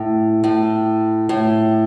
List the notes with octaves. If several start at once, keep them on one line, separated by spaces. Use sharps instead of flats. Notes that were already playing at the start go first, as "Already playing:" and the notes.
Already playing: A2
A2
A2